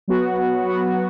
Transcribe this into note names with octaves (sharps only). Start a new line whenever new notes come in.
F#3 B3 F#4
F#3 B3 F#4